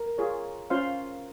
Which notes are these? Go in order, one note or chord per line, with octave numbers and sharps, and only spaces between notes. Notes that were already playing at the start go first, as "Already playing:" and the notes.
Already playing: A#4
F4 G#4 C#5
C#4 F4 C5 F5 C6